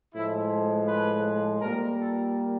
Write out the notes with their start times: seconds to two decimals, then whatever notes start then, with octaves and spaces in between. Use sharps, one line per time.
0.15 A2 F3 G#3 E4
0.88 B4
1.62 A#2 G3 A#3 A#4
1.99 A4